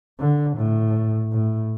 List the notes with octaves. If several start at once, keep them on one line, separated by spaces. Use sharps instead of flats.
D3
A2
A2